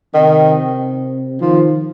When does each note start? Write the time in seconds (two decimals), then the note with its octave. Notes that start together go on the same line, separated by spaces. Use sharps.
0.14 C3 D#3
1.41 D#3 F3